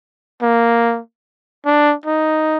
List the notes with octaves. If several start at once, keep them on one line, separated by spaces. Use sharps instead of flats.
A#3
D4
D#4